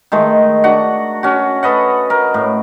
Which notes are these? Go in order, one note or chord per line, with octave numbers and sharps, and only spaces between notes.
D#3 G#3 A3
D4 F#4 F#5
C#4 F#4
A4 B4 D#5 F#5
A#4
A2